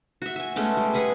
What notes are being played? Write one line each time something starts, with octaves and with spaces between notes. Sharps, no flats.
F#4 E5
E5 G#5
G#3 A3 B3 C#4
G3
G#4 B4 F#5 G#5